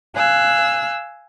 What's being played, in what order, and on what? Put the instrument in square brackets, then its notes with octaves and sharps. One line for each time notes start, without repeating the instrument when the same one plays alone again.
[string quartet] F5 G#5 E6 F#6